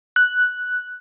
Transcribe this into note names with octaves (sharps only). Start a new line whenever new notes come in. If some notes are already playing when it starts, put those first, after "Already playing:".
F#6